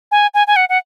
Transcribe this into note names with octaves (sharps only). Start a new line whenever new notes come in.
G#5
G#5
G#5
F#5
F#5